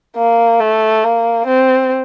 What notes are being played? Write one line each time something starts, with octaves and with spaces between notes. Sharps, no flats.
A#3
A3
A#3
C4